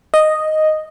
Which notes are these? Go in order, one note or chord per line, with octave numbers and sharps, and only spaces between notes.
D#5